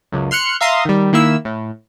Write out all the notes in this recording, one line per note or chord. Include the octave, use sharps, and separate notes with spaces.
C#2 F#2
C6 F6 F#6 C#7
E5 F5 A#5 C6 D#6
D#3 G3
D#3 A#3 E4 E6
A2